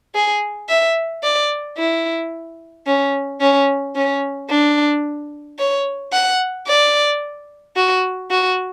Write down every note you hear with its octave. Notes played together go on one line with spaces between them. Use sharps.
G#4
E5
D5
E4
C#4
C#4
C#4
D4
C#5
F#5
D5
F#4
F#4